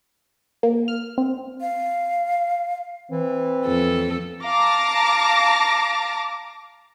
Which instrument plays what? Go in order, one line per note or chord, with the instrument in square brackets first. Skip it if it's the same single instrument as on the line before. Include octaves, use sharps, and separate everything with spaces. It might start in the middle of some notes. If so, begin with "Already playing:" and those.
[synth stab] A#3
F6
C4
[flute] F5
[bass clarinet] E3 [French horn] C4
[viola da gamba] F2 A4
[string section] F5 A5 A#5 D6 A#6